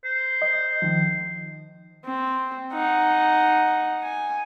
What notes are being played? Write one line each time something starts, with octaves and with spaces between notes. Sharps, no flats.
C5
D#5
D#3 F3
C4
D#4 F#5
G#5